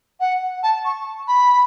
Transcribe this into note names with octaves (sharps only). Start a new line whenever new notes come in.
F#5
A5
C#6
B5